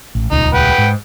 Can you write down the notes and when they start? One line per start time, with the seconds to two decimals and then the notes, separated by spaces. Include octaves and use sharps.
0.15 A1
0.31 D#1 C#2 D#4
0.54 B4 F#5 G5
0.78 G#2